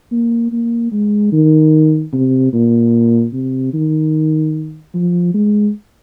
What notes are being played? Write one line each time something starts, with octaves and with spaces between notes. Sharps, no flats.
A#3
A#3
G#3
D#3
C3
A#2
C3
D#3
F3
G#3